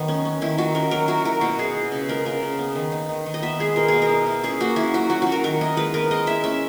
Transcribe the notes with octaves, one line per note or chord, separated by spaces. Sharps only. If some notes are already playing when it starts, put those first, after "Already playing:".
Already playing: D#3 F#3 B3
C#4
C#4
D#3 E4
D#3 F#4
C#4 A#4
F#3 A#4
E4 F#4
E4 A#4
B2 F#4
E4 G#4
B3
C#3
G#3 A#4
C#3 A#4
C#3
B3
D#3
D#4
D#3
D#3
D#5
B3 E5
G#3 G#4
B2 A#4
B2 G#4
A#4
E4
E4
C#4 G#4
A#3 F#4
C#4 E4
F#3 F#4
C#4 F#4
C#4 F#4
A#4
D#3 A#4
E4 D#5
G#3 B4
B3 A#4
G#3 D#5
E4 E5
C#4 E5